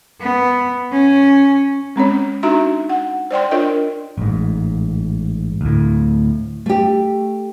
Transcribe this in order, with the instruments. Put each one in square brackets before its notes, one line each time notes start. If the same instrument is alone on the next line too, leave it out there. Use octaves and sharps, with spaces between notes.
[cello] B3
C#4
[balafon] G#3 C4 C#4 C#5
D4 D#4 F#4 E5 A#5 C6
F#5
C5 D5 G5 C6
D4 F4 A#4 C#5 D#5 G5
[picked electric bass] A1 G#2
D2 A2
[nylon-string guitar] A3 G4